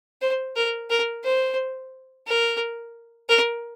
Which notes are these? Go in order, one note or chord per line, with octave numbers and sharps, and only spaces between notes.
C5
A#4
A#4
C5
A#4
A#4